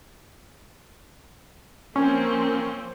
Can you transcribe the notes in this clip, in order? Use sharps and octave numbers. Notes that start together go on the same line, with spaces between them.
F3 A#3 C4 C#4